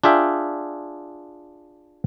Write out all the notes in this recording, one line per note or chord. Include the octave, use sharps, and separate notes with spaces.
D4 F4 G#4 E5 G5